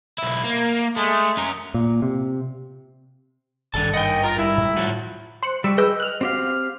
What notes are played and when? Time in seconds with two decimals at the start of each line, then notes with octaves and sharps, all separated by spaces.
0.18 B1 E4
0.44 A#3
0.97 G#3 A3
1.37 C#4 A#4
1.74 A#2
2.02 C3
3.74 G#1 G2 D#3 A4 A5
3.94 D#2 D#5 F#5 G5
4.23 F4 A#4
4.38 G2 E4
4.58 A2 G3
4.77 F3 F#4
5.43 C5 F#6 C#7
5.64 G3 C#6 D6 E6
5.78 G#4 B4 D#5 G5 E6
6.00 F6 F#6
6.21 C4 F#4 G4 F5